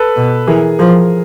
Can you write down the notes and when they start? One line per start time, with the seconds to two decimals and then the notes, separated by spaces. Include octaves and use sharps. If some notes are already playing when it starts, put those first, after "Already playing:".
Already playing: A4 B4
0.16 B2
0.47 E3 G#4 A#4
0.79 F3 G#4 A#4